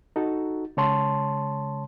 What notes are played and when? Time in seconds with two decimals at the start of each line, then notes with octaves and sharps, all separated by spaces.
0.16 D#4 F#4 A4
0.77 C#3 G#3 C#5 A5 C6